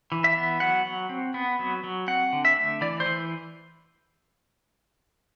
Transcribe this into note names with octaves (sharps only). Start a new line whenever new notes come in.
E3
E5
B3
F#3 F#5
F#3
C4
B3
F#3
F#3
C4 F#5
D3
E5
A3
E3 D5
C5
E3